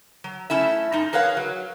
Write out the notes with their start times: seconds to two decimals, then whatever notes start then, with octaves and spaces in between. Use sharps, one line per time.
0.24 F#3
0.50 A3 C#4 E4 E5
0.92 F#2 D#4
1.13 G#4 A#4 B4 C#5 F5 F#5
1.37 F#3